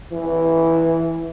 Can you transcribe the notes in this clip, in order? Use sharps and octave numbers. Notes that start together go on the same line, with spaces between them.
E3